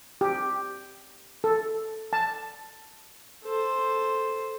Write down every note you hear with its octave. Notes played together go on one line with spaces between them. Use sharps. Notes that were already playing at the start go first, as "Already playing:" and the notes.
G4
A4
A5
A4 C5